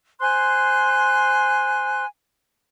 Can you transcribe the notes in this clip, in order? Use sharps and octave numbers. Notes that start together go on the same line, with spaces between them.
C5 G#5 C6 F#6